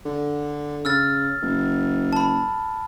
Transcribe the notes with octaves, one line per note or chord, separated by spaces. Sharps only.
D3
C#3 E6 F6 A6
F#1
A5 B5